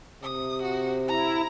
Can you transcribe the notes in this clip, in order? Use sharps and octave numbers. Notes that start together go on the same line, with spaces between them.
C3 D#6
F#4
E4 A#5